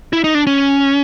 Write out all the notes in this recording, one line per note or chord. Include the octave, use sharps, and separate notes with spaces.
E4
D#4
D4
C#4